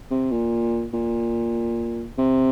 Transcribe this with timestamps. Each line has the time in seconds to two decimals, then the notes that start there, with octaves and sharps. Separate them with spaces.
0.11 C3
0.32 A#2
0.93 A#2
2.18 C3